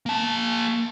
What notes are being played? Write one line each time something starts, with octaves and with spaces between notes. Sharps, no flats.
A#3 A5